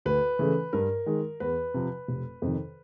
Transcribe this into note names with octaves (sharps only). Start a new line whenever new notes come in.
D2 B4
C#3 E3 A3
G2 A#4
D#3 G#3
E2 B4
C3 F3
F1
F2 C3 D#3